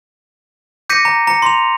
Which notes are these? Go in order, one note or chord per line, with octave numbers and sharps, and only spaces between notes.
D6 G6 A#6 B6 C#7 D#7
A#5
A#5 C#7
C6 F7